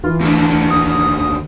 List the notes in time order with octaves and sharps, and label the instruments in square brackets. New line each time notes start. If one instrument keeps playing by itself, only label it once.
[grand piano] E3 [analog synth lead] F4
[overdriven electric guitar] D#2 D3 [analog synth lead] A3
[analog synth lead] D#6